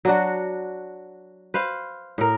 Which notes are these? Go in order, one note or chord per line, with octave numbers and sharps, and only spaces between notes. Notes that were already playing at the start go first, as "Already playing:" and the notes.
F#3 D4 F#4
B4 C5 F5
A2 A#4